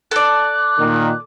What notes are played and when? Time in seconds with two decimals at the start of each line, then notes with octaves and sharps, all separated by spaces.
0.11 A4 D5 F#6
0.79 A#2 D#3